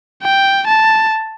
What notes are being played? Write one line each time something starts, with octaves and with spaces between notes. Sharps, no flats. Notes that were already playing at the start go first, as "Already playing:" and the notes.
G5
A5